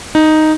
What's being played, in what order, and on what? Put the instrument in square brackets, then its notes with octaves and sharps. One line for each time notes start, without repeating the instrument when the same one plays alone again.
[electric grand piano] D#4